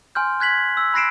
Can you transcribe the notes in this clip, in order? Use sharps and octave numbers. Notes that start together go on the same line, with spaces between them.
G#5 C6 F6 G6
F#6 G#6 B6 F#7
E6
B5 F#6 A#6 C7 D7 E7